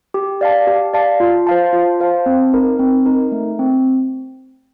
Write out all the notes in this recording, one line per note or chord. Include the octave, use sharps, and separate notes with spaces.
G4
D5 F5 A5
G4
D5 F5 A5
F4
C5 F5 A5
F4
C5 F5 A5
C4
D#4 A#4
C4
D#4 A#4
A3
C4